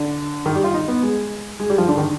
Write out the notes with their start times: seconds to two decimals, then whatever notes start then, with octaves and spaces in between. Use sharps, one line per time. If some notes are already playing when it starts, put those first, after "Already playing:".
Already playing: D3
0.46 D#3
0.56 G3
0.64 F4
0.74 D#4
0.88 B3
1.03 G#3
1.60 G#3
1.70 G3
1.78 F3
1.88 D3
1.97 D#3